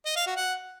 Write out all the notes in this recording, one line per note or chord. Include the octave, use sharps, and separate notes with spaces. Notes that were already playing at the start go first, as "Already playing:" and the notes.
D#5
F5
F#4
F#5